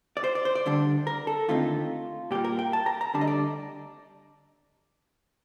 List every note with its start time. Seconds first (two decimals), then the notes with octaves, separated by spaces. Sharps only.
0.17 D5
0.24 C5
0.35 D5
0.45 C5
0.55 D5
0.66 D2 D3 G3 D4
1.07 A#4
1.27 A4
1.48 D#2 D3 A3 C4 D#4 F4
2.31 A#2 G3 A#3 G4
2.44 A#4
2.59 G5
2.73 A5
2.86 A#5
3.01 A#5
3.14 D2 D3 G3 D4 A5
3.21 D#5
3.27 D5